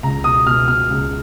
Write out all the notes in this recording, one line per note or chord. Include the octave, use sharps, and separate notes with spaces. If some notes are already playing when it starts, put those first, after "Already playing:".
C#2 A#5
B2 D#6
B2 F6
B2 F6
C#2